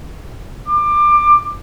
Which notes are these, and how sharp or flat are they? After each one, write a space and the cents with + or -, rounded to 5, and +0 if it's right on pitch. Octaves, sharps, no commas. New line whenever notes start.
D6 +20